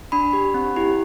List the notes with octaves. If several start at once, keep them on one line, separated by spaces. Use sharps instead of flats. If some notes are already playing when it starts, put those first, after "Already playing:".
D4 B5
G4
C4
E4 G4